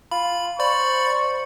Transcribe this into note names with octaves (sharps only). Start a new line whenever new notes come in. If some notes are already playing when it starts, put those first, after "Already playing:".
F4 B5
C5 D5 B5 C#6